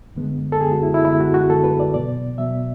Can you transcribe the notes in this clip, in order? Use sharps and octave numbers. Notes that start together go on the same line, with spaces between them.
F#2 D3 G#3 B3
A4
F#2 D3 G#3 B3 G#4
F#4
E4
E4
F#2 D3 G#3 B3 E4
F#4
F#4
F#2 D3 G#3 B3 A4
B4
D5
B2 F#3 B3 D5
B2 F#3 B3 E5